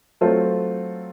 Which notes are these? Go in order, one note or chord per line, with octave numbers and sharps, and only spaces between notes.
F#3 A3 C4 F4 A4